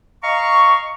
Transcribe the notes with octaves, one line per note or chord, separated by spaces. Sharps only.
D#5 F5 A#5 C#6